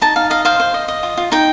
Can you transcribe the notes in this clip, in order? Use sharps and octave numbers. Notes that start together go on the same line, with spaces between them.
D#4 A5
D#4 F5
D#5 F5
C5 F5
C5
D#5
D#5
F4
F4
D#4 G5